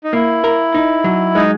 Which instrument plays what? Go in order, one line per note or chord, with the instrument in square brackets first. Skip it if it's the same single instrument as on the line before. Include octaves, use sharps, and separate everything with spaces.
[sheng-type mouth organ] D#4
[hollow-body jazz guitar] A#3 [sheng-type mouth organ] E4
[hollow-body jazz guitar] A#4
D#4
F#3
[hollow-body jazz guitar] G#3 [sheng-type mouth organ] D#4